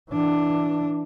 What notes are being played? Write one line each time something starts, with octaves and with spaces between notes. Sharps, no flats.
E3 D4